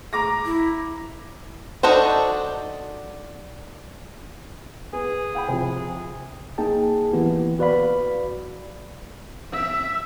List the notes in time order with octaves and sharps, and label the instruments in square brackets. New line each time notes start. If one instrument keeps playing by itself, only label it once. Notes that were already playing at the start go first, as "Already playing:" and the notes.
[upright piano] A#5 D6 A#6
[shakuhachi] E4
[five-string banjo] D4 D#4 F#4 A4 C5
[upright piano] B3 [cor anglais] G#4
[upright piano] F5 G5 B5
[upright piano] C3 F3 [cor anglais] G#4
[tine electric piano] A#3 D#4 G#4 G5 A5
E3 A#3 B3 E4 G4
F#4 B4 D5 F5 B5
[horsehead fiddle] E5